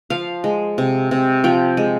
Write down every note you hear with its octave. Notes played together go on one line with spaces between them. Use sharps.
F3 F5
G#3
C3
C3
F3 G5
G#3